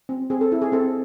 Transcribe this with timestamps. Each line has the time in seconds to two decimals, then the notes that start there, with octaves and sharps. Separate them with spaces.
0.09 C4
0.30 C4 G#4
0.41 A4
0.52 E4
0.62 G#4
0.72 C4 A4